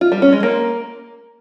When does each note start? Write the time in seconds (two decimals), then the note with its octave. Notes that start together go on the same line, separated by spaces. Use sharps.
0.01 F4
0.12 G3
0.22 C#4
0.32 G#3
0.43 A#3